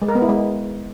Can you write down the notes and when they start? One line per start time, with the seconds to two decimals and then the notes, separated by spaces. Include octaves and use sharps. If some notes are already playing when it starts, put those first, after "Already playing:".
0.02 G#3
0.08 A#4
0.15 B3
0.22 E4
0.29 G#3